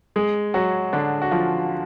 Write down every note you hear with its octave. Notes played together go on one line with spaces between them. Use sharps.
G#3 G#4
F#3 F#4
D3 D4
F#4
F3 F4